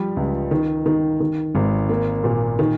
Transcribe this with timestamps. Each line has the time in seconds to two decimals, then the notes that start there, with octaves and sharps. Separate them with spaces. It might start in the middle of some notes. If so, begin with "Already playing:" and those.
Already playing: F3 G3
0.17 C#2
0.51 D#3
0.86 D#3
1.20 D#3
1.55 G#1
1.89 A#3
2.24 A#2
2.59 D#3